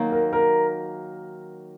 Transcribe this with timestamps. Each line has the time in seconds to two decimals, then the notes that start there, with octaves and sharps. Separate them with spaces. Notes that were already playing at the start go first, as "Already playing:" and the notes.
Already playing: D#3 F#3 A#3
0.12 A#4
0.33 A#4